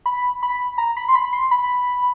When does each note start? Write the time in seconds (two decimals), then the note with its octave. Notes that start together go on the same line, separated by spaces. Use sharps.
0.06 B5
0.43 B5
0.78 A#5
0.97 B5
1.08 C6
1.15 B5
1.33 C6
1.51 B5